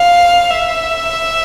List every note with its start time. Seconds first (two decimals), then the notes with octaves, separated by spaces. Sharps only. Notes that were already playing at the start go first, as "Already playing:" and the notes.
Already playing: F5
0.51 E5